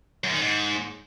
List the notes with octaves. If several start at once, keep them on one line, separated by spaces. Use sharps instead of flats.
F#2
D#3
G#2